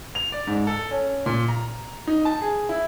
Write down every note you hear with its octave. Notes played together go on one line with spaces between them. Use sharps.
F7
D5
G#2
A4
C#4
A#2
A#5
D#4
A5
G#4
E4